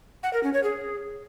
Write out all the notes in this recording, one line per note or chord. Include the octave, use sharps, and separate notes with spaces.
F#5
A#4
C#4
C#5
G#4